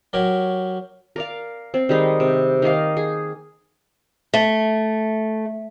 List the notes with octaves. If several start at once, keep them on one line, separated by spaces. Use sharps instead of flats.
F#3 G4 A#4 C#5
A#4 D5 F5
C4
D#3 G3 G#3 D#4
C3
D#3 A#3 D#5 F5
G#4
A3